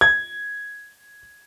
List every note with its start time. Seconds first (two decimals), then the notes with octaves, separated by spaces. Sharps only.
0.01 G#6